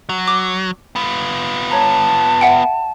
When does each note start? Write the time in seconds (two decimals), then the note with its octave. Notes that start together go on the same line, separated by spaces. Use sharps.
0.09 F#3
0.28 D6
0.96 B3 F4
1.71 C#5 A5 A#5
2.41 E5 F#5 G5